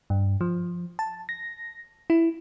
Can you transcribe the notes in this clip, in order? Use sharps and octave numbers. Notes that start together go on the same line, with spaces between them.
G2
F3
A5
A#6
E4